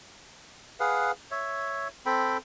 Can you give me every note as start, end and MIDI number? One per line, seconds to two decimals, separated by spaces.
0.80 1.11 68
0.80 1.11 71
0.80 1.11 77
0.80 1.11 78
1.31 1.88 73
1.31 1.88 76
2.06 2.37 60
2.06 2.37 69
2.06 2.37 79
2.06 2.37 83